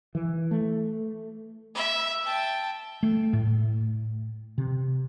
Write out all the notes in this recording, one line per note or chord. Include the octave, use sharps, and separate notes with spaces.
E3
A3
E5
G5 A5
A3
A2
C3